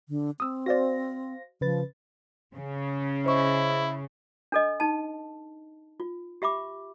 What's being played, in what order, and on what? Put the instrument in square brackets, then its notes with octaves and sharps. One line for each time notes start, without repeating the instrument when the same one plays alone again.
[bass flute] D3
[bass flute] C4 [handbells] D#6 E6
[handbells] F#4 D5 [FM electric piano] C5 F5 A#6
[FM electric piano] C#3 B4 A6 [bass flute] F3
[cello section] C#3
[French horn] E4 [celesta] C5 D#5 C#6
[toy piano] D4 A4 D#5
D#4 A5
F4
G4 E5 B5 D6